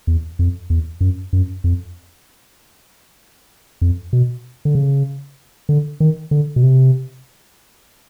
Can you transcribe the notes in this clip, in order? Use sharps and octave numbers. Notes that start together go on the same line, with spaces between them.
E2
F2
E2
F#2
F#2
F2
F2
B2
D3
C#3
D3
D#3
D3
B2
C3